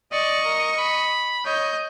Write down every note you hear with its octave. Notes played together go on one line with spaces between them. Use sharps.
D5 D#5 C#6
A#4
B5
C#5 D#5 G6